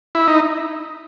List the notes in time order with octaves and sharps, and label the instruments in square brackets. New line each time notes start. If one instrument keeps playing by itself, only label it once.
[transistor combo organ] E4
D#4